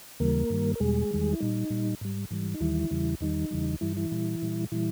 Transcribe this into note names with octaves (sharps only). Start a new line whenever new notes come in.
D#2 C#3 E3 G3 A#3 A#4
G2 D#3 G3
A#4
E2 B2 G3 G#3 G#4
E2 D#3 G3
E4
A#2 G3 D#4
A#2 G3
G#2 G3
G#2 E3 G3
D#4
D#2 D#3 E3 G3 E4
E2 C#3 E3 G3
E2 D#3 G3 D#4
E2 C#3 E3 G3
G2 E3 G3 E4
E3 E4
A#2 G3
A#2 G3
A#2 E3 G3 E4